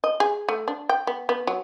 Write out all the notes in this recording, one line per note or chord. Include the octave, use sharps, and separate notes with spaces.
D#5
G#4
A3
D4
G5
B3
B3
F#3